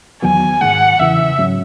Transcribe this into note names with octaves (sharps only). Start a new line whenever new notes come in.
E2 D#3 F#3 B3 G#5
G#2 D#3 G#3 F#5
E2 C#3 E3 E5
G#2 F#3 C#4